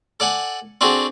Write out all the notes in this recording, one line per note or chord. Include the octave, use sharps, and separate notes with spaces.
A4 D5 F#5 G#5
C4 D4 F#4 G#4 A4